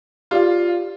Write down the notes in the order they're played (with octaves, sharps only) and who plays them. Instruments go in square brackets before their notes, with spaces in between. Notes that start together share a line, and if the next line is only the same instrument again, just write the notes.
[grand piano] F4 [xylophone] G4 D5 F5